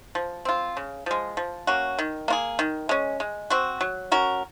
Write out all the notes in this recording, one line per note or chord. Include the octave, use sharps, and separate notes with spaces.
F3
C4 F4
C#3
F3 G#3
F3
A#3 C#4 F#4
D#3
A#3 F4 G#4
D#3
G#3 C#4
G#3
C4 F#4
F#3
C#4 F#4 A#4